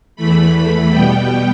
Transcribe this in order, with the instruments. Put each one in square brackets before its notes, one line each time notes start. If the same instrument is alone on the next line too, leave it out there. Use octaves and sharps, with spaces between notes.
[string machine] E2 E3 A3 B5
B5
B2 G3 B3 G5